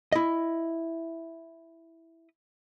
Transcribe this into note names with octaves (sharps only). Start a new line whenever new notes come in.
E4 D#5